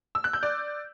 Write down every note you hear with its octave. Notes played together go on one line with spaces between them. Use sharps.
E6
F#6
G6
D5